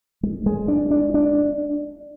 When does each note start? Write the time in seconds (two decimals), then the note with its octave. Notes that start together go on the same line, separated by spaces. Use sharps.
0.23 G#3
0.46 G#3
0.68 D4
0.91 D4
1.14 D4